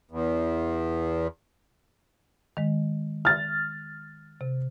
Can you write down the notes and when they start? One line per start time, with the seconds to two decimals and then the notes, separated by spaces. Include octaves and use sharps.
0.11 E2
2.57 D#3 G#3
3.25 F6 A6
4.41 C3